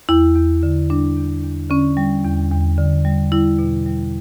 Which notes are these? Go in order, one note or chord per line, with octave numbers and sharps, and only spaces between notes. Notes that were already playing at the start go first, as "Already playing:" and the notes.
E2 E4
E2
D3
G3 D4
E2
E2
D3 C#4
G3
E2
E2
D3
G3
G3 E4
B2
G3